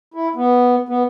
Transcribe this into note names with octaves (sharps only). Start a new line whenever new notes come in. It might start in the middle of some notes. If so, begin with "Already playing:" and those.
E4
B3
B3